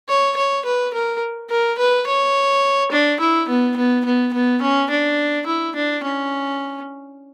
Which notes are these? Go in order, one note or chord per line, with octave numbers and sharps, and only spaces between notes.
C#5
C#5
B4
A#4
A#4
B4
C#5
D4
E4
B3
B3
B3
B3
C#4
D4
E4
D4
C#4